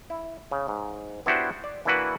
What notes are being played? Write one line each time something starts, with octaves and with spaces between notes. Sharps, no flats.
E4
C#3
G#2
B3 D4 E4 F#4 G4 C5
D5
E3 A#3 D4 E4 F#4 B4